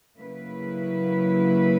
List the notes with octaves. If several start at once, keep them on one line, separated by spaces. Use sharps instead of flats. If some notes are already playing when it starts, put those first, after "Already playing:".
C#3 F#3 A#3 E4 B4